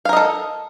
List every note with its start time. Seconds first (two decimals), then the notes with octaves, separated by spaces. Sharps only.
0.05 F5
0.09 A#4
0.13 D#5
0.17 A4